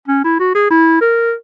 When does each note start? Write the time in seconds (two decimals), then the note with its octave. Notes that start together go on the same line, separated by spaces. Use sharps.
0.08 C#4
0.24 E4
0.40 F#4
0.55 G#4
0.71 E4
1.01 A#4